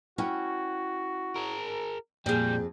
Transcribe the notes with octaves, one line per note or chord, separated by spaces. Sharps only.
C#4 E4 F#4 G5
G#4 A#4
F2 A#2 G3 G#4 G5